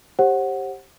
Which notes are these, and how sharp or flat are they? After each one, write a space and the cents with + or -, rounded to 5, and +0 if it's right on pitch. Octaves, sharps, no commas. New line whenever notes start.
G4 +0 C5 +40 F#5 +0